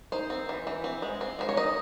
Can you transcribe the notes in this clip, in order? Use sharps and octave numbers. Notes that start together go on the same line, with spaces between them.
D#4 C5
C4
E3
E3
C4
G#3
C4
G#3 C5
C#5
D#4 D#5